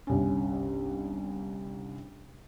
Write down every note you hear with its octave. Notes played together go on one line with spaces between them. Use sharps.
G1 C2 C#4